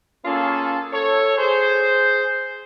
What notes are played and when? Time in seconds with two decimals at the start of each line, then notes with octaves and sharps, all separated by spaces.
0.25 A#3 C#4 F4 G#4 A4
0.93 A4 C#5
1.37 G#4 C5